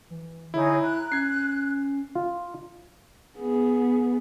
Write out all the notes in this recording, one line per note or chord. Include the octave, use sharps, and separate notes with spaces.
E3
D3 D#4 E4 G#4 C#5
A#5 F#6
C#4 G#6 C7
F4
B3 G#4